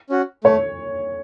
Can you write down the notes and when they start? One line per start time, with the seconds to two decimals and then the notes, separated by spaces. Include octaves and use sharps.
0.10 C#4 F#4
0.44 A3 C#5